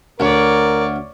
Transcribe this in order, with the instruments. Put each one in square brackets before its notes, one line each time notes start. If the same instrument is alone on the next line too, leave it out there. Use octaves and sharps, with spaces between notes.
[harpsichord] D2 [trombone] A#4 [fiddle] C#5 D5